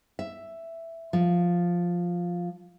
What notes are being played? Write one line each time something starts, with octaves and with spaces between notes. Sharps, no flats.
E5
F3